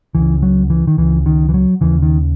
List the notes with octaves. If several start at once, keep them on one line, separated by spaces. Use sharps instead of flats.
C#2 C#3 E3
F#3
E3
D#3
C#2 C#3 E3
D#3
E3
F#3
D#2 C#3 E3
D#3